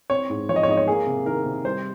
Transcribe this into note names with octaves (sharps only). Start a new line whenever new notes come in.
C4 C#5
G#2
F3 C#5
D#5
C#5
G#2 D#5
C#5
A#3 G#4
C3
D#3 A#4
C3
G3 C5